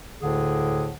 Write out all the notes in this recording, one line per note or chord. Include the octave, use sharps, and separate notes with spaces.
D2 A2 D3 G#4